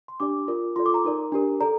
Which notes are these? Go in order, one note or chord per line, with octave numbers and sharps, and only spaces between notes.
C6
D4 G4 D5 D6
F4 A#4 D5
F4 A4 D5 C6
D6
A#5
D#4 A#4 D5
D4 G4 A#4
A4 D5 A#5